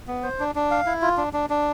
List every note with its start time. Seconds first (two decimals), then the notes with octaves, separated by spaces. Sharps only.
0.08 B3
0.23 C5
0.40 D4
0.55 D4
0.71 F5
0.86 E4
1.02 F4
1.17 D4
1.33 D4
1.50 D4